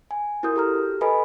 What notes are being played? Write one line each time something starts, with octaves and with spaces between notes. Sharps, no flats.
G#5
E4 F#4 A#4 D#6 G6
G4 A4 A#5 F6
A4 B4 D#5 G#5 B5